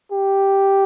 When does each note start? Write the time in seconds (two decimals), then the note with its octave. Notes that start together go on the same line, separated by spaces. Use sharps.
0.12 G4